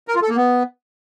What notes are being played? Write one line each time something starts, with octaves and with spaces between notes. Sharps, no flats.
A#4
F4
A4
A#3
B3